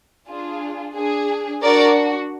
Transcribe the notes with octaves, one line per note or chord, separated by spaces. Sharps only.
D4 F4 G#4
D4 G#4
D4 F#4 A#4 D5